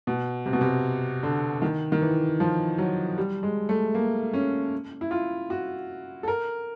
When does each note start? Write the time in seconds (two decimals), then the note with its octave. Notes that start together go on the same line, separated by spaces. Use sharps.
0.07 B2
0.46 C3
0.53 B2
0.61 C3
1.23 D3
1.62 D#3
1.92 D#3
2.01 E3
2.40 F3
2.78 F#3
3.18 G3
3.43 G#3
3.69 A3
3.94 A#3
4.33 C#4
5.01 E4
5.11 F4
5.50 F#4
6.23 A4
6.28 A#4